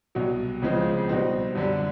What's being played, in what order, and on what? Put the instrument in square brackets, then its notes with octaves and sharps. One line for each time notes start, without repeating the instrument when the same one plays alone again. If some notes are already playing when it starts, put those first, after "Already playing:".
[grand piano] C2 B2 F#3
C#2 C#3 F3 G#3 C4
B2 G3 C4 D#4
F#2 D3 G3